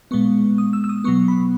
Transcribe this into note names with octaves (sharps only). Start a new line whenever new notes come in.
A#2 G#3 B3 C#6
D#6
E6
E6
D#6
B2 F#3 B3 C#6
B5